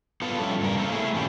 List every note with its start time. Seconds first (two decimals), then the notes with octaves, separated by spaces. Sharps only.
0.22 B3 F4 A4
0.39 F3 G3 A3 C#4 A4
0.60 G2 C#3 A#4
0.77 A3 A#3 C4 A4
0.91 A3 E4 G#4
1.15 A#2 D#3 C#4 D4 F4 G4